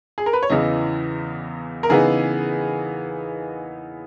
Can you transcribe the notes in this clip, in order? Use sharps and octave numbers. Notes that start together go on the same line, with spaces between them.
G#4
A#4
B4
C#5
E2 C#3 E3 D#5
A#4
C#3 E3 B3 D#4 G#4